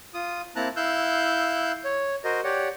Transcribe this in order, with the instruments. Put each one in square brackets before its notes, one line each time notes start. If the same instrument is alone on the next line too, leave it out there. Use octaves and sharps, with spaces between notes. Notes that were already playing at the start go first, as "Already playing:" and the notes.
[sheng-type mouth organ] F4 D#6
A#3 C4 E4 A5 A#5 F#6
E4 F5 E6 F#6 G6
C#5
F#4 A#4 C5 D#5
G4 C#5 D5 F#5